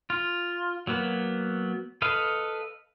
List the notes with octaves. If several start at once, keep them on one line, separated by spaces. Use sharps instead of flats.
F4
F#3 A#3 B3
A4 B4 D#5 F5